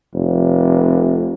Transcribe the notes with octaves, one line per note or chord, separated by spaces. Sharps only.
F1